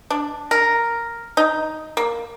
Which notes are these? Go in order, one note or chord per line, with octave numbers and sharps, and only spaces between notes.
D4
A#4
D#4
A#3